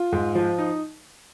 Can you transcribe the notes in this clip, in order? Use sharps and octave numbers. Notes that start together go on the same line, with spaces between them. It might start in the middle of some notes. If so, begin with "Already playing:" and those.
Already playing: F4
G#2
F3
D#4